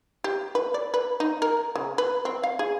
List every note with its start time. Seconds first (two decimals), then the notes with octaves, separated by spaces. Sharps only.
0.24 G4
0.55 B4
0.74 D5
0.94 B4
1.20 D#4
1.42 A#4
1.75 C#3
1.98 B4
2.25 C4
2.43 F5
2.59 G#4